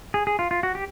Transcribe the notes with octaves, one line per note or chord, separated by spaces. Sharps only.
G#4
G#4
F4
F4
F#4
G4